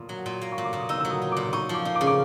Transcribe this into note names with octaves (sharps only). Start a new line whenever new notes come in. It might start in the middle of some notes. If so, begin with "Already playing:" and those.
Already playing: A#2 D6 D#6
F#3
A#2
A#3
C#6
A#2
D6
A#2 D#6
D#4 E6
F#3 E6
D#6
D#4
A#2 D6
D#4 C#6
F3 D6
D#4
D6
C#3
D6